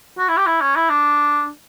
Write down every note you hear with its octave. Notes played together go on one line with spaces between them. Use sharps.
F#4
E4
G4
E4
C#4
E4
D4